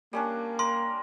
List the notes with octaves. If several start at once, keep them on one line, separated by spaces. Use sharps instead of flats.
G3 A#3 C#4 D4
A#4 C6